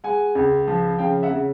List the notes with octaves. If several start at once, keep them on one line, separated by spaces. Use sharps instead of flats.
G#3 F#5 G#5
C#2
F3
C#3 F5 G5
E5 F#5
C#3